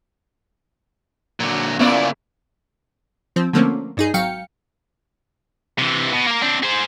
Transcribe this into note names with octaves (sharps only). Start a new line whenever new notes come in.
A#2 D3 F#3
A#2 C#3 A#3 B3 C#4 E4 D5
F3 C4
D3 F3 A3 A#3 C4 C#4
G2 D#4 G#4
G#1 F#3 F5 G5 C#7
C3 E3
B2
A#3 A#4
C4 D4
G#4 C5